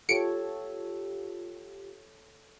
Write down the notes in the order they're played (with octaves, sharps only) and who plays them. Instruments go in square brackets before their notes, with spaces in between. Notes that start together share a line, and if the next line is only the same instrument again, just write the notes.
[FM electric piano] F4 G4 [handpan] A4 C#5 [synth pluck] C#7 D7